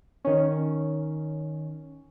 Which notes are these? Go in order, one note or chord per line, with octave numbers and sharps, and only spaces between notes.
D#3 C#4